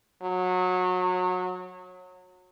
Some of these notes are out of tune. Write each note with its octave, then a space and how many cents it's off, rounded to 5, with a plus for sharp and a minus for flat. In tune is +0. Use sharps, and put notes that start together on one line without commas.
F#3 -25